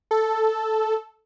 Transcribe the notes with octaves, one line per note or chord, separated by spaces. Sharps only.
A4